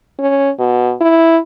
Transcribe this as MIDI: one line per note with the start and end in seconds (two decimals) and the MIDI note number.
0.19 0.51 61
0.59 0.93 47
1.01 1.38 64